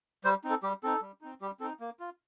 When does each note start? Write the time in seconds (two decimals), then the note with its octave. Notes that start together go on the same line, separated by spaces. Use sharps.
0.24 G3 C5
0.44 C4 D#4
0.50 A4
0.63 G3 G4
0.83 C4 D#4 A4
1.02 G3
1.21 C4 D#4
1.41 G3 G4
1.60 C4 A4
1.63 D#4
1.80 A#3
2.00 F4